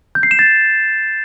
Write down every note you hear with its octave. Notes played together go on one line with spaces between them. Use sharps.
G6
C7
E7
A6